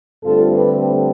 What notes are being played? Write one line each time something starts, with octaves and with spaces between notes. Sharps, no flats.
G2 D3 A3 C4 F4 A4
G4 B4